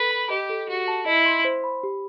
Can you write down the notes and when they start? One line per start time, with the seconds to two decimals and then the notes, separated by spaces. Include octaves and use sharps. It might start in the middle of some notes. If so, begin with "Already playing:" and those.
Already playing: A4 B4 B5
0.11 B5
0.30 G4 D#5
0.50 A4
0.68 F#4 G4
0.88 A5
1.06 E4 D#5
1.26 C6
1.45 C5
1.64 B5
1.84 G4